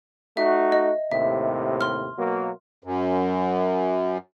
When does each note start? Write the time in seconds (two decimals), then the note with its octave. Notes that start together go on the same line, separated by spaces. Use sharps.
0.37 A3 D#4 F#4 E5
0.72 D#5
1.11 D#2 A2 C3 E5
1.81 C6 F6
2.18 B2 F#3 A#3
2.84 F#2